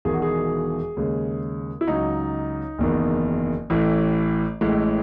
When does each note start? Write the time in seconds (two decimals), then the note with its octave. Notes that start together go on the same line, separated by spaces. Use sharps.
0.05 E1 E2 D#3 G#4
0.13 F#4
0.22 G#4
0.97 D#2 C#3 G#3
1.81 E4
1.87 C#2 C#3 F#3 D#4
2.78 F#1 E2 D#3
3.70 A1 A2 E3
4.61 A1 A2 E3 G#3